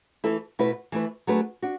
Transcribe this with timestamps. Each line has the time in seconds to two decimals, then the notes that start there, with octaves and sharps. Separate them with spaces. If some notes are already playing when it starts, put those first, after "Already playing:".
0.24 E3 A3 E4 A4
0.59 B2 A3 E4 B4
0.92 E3 A3 E4 B4
1.27 F#3 A3 D4 G#4 B4
1.62 D4 F#4